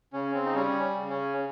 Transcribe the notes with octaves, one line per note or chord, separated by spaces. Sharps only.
C#3 C#4
C4
D#4
G3 C#4
C#3
C#4